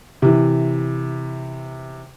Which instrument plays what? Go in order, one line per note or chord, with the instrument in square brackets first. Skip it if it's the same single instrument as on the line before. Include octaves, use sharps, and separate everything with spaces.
[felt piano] C3 E3